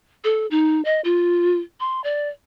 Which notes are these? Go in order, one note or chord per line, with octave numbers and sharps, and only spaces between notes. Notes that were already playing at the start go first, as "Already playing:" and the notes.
A4
D#4
D#5
F4
C6
D5